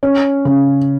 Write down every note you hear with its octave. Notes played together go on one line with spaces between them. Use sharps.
C#4
C#3